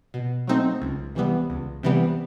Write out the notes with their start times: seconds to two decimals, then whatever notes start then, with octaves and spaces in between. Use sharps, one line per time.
0.14 B2
0.47 F#3 A3 C4 D#4
0.82 C#2
1.15 C3 E3 G3 B3
1.50 C#2
1.83 C3 E3 G3 B3